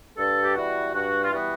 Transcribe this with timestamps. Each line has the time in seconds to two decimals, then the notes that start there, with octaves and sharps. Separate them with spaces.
0.17 G2 A4
0.44 G4
0.55 E3 G3 B3 F#4
0.93 G2 F#4
1.24 F4
1.31 E3 G3 B3 F#4